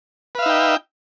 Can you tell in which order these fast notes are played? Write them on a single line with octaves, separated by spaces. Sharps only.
B4 F5 E5 D#4 G5